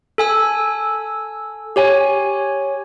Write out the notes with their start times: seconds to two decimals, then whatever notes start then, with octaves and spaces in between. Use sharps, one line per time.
0.18 A4 G#5 E6
1.76 G4 C#5 G#5